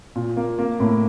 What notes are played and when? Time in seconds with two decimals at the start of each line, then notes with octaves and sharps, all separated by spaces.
0.15 A#2
0.36 A#3
0.58 A#3
0.80 A2